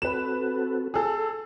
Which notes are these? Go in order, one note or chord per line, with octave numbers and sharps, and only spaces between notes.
C4 F#4 A4 B4 E7
G#4 A4